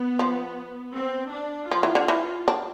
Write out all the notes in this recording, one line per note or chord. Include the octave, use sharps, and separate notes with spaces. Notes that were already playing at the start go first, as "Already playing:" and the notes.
Already playing: B3
F3
C4
D4
F3 F4
E3
D3
E3
D4